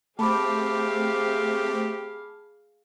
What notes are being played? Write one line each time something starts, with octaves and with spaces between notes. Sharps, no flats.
A3 C4 G4 G#4 F5 A5 B5 D6